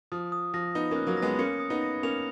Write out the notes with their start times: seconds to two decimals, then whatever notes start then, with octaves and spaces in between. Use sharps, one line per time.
0.12 F3 D#6
0.32 D#6
0.54 F3 A#6
0.75 B3 D#4 D#6
0.91 A#3 C#4 F#6
1.07 F#3 A#3
1.17 A#6
1.22 G#3 B3
1.39 A#3 C#4 C#7
1.60 D#6
1.70 B3 D#4
1.82 A#6
2.03 A#3 C#4 F7